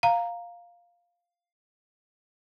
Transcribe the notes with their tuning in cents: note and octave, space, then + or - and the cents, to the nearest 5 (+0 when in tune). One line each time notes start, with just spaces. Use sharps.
F5 +0 A#5 +0